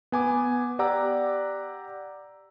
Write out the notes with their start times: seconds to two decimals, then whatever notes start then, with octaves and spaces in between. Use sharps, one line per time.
0.12 B3 G#5 D6
0.79 G4 D5 F#5 A#5 D6 E6